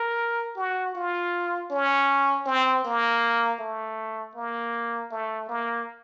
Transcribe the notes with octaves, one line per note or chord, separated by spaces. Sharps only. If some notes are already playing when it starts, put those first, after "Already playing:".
Already playing: A#4
F#4
F4
C#4
C4
A#3
A3
A#3
A3
A#3